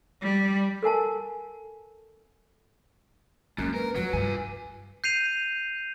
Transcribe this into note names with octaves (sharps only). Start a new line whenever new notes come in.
G3
A4 A#4 G#5 A5
F#2 G#3 A#3 C#4
A#4 B4
F2 F#3 B4
G2 G3 F4 G#5
G6 C7 D#7 F7